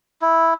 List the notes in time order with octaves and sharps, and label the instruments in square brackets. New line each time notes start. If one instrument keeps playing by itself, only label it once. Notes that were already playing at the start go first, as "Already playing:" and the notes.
[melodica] E4